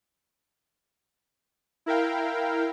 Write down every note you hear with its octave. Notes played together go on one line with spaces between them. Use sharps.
E4 A#4 F5 G5